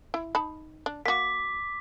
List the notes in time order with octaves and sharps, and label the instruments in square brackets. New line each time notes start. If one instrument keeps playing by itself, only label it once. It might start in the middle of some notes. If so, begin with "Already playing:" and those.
[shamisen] E4
D#4 A5 B5
D4
[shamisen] A#3 F#4 [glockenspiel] D6 B6